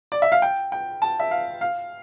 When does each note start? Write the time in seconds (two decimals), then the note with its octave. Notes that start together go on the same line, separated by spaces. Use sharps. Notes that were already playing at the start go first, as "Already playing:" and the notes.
0.12 D5
0.22 E5
0.32 F5
0.42 G5
0.72 G5
1.02 A5
1.20 E5
1.31 F5
1.61 F5